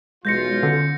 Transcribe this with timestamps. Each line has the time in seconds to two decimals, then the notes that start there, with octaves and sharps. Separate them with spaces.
0.25 B1 E2 G#3 F4 G6 A#6 C#7
0.63 D3 C#4